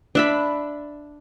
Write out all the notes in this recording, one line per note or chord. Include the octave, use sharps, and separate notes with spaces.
D4 E5 B5